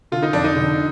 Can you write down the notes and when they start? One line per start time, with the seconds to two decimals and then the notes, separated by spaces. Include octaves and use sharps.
0.12 D3 F4
0.23 D#4
0.33 F2 D4
0.44 D#4
0.56 D3